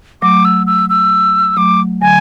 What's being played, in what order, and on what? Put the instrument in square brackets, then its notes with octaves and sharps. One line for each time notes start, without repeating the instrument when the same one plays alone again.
[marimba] F#3 A3 [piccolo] D6
[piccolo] E6
E6
E6
[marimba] F#3 A3 [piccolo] D6
[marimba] D3 F#3 [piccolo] G#5